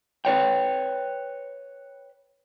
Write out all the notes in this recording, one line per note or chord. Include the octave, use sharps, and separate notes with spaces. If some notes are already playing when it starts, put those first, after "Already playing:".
B4 C#5 G5